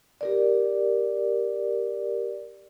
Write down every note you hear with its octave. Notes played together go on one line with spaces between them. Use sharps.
G4 A#4 D5